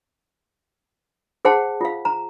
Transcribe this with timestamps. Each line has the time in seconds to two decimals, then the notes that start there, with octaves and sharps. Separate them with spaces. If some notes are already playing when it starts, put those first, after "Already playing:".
1.45 G#4 C5 F#5 G5 A5
1.81 F4 F5
2.05 A#5